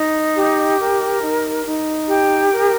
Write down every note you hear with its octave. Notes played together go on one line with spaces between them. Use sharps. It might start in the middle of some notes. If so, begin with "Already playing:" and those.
Already playing: D#4
G4
A#4
D#4
D#4
G4
A#4